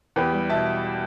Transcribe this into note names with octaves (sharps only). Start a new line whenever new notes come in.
E2 G4 B4
G3
B2 E5 A5